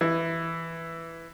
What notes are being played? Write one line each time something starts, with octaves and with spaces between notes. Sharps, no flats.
E3